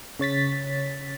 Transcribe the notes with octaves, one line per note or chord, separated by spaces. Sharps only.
C#3 C#5 A6 B6